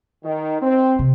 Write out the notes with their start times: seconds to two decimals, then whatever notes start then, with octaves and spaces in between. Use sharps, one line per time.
0.25 D#3
0.61 C4
0.99 C3